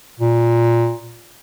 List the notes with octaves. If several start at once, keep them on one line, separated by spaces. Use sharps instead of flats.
A#2